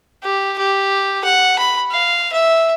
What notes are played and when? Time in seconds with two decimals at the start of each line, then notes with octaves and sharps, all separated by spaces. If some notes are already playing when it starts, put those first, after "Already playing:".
0.23 G4
0.58 G4
1.24 F#5
1.59 B5
1.91 F5
2.32 E5